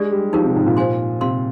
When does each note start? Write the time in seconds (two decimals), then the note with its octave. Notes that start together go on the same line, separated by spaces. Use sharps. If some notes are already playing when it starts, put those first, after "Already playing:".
Already playing: G#3 D4 G4 D5
0.11 G3
0.33 F3 D#4 G4 A#4
0.44 C3
0.56 G#2
0.66 A#2
0.77 C5 F5 G#5 C6
1.21 C3 A#4 F5 C6